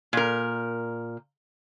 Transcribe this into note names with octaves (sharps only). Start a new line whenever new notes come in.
A#2 A#4